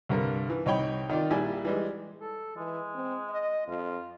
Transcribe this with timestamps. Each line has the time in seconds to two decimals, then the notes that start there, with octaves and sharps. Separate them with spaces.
0.09 C2 G2 D3 A#4
0.50 E3
0.66 C2 D#4 C#5 G5 B5
1.10 D#3 D#4 F4 D5
1.30 A#1 G3 E4 D5 G#5
1.65 E3 G3 G#3
2.21 A4
2.56 E3 G#3
2.95 C4
3.29 D#5
3.67 F2 F4